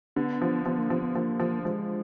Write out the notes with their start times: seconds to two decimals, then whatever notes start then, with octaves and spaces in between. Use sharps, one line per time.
0.16 D3 B3
0.41 F3
0.66 F3 B3
0.78 A#3
0.90 F3 B3
1.03 B3
1.15 F3 A#3
1.40 F3
1.65 F3 G#3